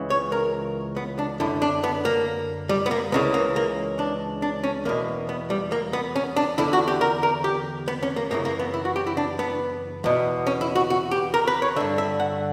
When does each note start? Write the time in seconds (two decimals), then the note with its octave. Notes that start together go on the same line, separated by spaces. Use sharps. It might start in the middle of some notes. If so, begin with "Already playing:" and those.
Already playing: C#2 C#3 E3
0.10 C#5
0.32 A#4
0.96 B3
1.19 D4
1.40 F#2 D3 E4
1.62 D4
1.84 B3
2.05 A#3
2.69 G3
2.86 B3
2.91 A#3
3.12 C#2 C#3 E3 B3
3.34 A#3
3.56 A#3
3.99 D4
4.42 D4
4.63 C#4
4.85 E2 B2 A#3
5.29 B3
5.50 G3
5.72 A#3
5.93 B3
6.16 C#4
6.36 D4
6.58 E2 D3 E4
6.73 F#4
6.88 G4
7.01 A#4
7.23 A#4
7.44 G4
7.88 B3
8.03 C#4
8.16 A#3
8.31 F#2 C#3 E3 A#3
8.45 A#3
8.60 B3
8.74 E4
8.85 F#4
8.96 G4
9.07 E4
9.17 D4
9.39 B3
10.04 E2 B2
10.47 C#4
10.61 E4
10.75 F#4
10.90 F#4
11.11 G4
11.34 A#4
11.47 B4
11.62 C#5
11.76 D3 E5
11.80 G2
11.98 E5
12.20 F#5